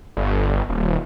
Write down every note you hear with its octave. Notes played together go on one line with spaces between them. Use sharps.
G1
D#1